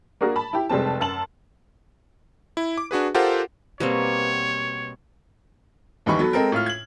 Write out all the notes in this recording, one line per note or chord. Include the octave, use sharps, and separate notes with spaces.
A#3 D4 F#4 G#4 A#4
A5 B5
E4 G4
F1 G3 G#3 C4 A5
F#2 A5 F#7
E4
D6
D4 F#4 G#4 B4
F4 G4 A4 A#4 C5 F#5
B2 G3 A#3 C4 C#5
D#2 E3 G3 D#4 B5 C#6
F#3 B3 A4 B4
G#3 C4 A4 A#4
A2 F4 F6
G#6 F#7